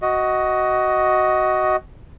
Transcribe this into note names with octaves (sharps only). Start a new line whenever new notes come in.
F#4 D#5